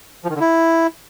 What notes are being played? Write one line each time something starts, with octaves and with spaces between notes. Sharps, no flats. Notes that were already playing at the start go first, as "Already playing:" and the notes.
F3
D#3
D3
E4